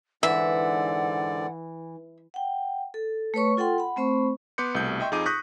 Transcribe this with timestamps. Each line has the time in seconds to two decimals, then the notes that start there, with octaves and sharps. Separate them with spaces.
0.23 G#2 D3 E3 D5 E5 F#5
2.34 F#5 G5
2.94 A4
3.34 A3 B4 C#5 C#6
3.57 F4 A4 F#5 G5 C6
3.78 F#5 B5
3.96 A3 C4 C5 B5 C#6
4.58 B3 B4 C6 D6 G6 C#7
4.75 C2 B2 A3 G6
5.00 D#5 E5 G5 C6 C#6
5.12 F2 D#4 F4 G#4 D6 D#7
5.26 C#6 D#6 F#6 G6 A#6 B6